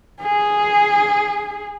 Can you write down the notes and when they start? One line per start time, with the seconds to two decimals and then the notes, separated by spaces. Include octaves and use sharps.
0.21 G#4